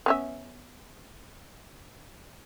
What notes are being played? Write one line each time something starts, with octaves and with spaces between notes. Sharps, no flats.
B3 C#4 E5